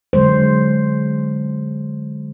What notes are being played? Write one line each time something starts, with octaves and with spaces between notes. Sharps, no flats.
D3 F#3 G#3 C5